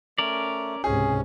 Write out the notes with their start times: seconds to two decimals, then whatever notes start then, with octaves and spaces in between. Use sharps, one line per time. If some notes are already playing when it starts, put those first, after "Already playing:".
0.18 A3 C#4 A#4 D5
0.84 C#2 G#2 C3 C#4 G#4